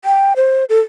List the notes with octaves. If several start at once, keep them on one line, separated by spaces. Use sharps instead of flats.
G5
C5
A4